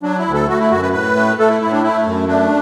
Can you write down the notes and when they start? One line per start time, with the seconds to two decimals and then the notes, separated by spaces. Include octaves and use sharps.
0.03 F#3 D4
0.19 E4
0.26 D2
0.34 A4
0.49 A3 F#4
0.60 E4
0.71 F#2 F#4
0.83 B4
0.93 A2 B4
1.16 A3
1.39 A3 A4
1.49 E4
1.61 A2 E4
1.72 D4
1.83 A3 E4
2.06 F#2
2.28 A3 D4